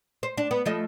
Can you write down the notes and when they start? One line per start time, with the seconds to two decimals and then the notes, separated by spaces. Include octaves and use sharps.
0.23 C5
0.37 D4
0.51 B3
0.65 F3 A3 D#5